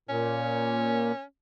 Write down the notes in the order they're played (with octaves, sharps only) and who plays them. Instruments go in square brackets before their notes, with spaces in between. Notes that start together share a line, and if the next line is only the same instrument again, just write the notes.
[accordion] A#2 [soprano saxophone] C#4